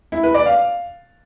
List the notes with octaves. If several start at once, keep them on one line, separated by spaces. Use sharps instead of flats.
E4
B4
D5
F5